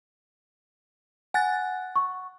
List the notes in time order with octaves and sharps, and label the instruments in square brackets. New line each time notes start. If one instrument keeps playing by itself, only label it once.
[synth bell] F#5 F#6 A6 [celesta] G#5
[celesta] C#6